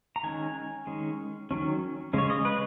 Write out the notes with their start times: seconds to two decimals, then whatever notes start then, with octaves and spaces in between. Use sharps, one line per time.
0.16 A#5
0.23 D#3 G#3 C#4 G#5
0.87 D#3 G#3 C#4
1.51 D#3 F#3 C#4
2.13 C#3 G#3 C#4 C#5
2.30 D#5
2.45 B4